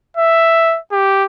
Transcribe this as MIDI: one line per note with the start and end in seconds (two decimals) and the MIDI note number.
0.17 0.79 76
0.92 1.25 67